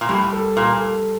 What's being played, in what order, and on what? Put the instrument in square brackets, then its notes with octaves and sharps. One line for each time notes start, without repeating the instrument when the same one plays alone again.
[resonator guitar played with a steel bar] A#2
[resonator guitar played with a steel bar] A2 [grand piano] G3
[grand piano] A4
[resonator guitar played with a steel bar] A#2 [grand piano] A4
[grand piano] A4